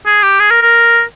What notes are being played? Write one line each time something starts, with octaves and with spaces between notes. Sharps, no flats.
G#4
G4
G#4
A#4
A#4